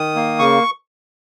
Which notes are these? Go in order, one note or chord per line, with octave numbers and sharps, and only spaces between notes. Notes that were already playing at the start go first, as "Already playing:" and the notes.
Already playing: D#3 D#6
A#3
C#3 C#6